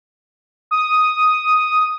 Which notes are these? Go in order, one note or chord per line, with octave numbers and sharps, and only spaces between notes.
D#6